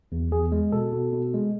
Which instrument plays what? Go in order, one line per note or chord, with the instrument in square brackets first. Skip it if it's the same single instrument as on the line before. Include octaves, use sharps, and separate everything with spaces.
[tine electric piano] E2
E2 G#4
G#3
B2 A4
B2
B2
G#3